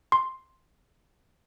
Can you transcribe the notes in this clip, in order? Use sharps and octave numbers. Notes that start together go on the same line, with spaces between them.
C6